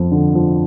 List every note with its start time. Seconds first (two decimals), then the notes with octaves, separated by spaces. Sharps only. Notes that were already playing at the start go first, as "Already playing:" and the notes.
Already playing: F2 F3
0.11 D3
0.35 F3